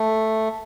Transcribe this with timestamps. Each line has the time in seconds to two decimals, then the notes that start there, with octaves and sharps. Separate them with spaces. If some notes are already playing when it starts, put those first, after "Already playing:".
Already playing: A3